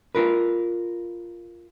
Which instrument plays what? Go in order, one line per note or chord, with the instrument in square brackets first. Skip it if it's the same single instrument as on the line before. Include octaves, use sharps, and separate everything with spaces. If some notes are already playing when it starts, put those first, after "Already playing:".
[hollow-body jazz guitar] F4 A#4 B4